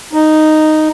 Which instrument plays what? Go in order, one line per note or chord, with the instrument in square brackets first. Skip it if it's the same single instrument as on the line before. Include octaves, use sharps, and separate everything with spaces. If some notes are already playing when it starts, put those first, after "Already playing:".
[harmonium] D#4